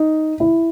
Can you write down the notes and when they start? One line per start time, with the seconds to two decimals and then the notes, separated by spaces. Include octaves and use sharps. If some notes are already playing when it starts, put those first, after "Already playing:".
Already playing: D#4
0.40 E4